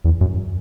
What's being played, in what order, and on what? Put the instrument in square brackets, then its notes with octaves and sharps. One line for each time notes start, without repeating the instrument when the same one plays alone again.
[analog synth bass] E2
F#2